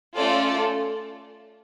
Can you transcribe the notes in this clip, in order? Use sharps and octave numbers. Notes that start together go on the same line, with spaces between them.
A3 C#4 F4 A4 D5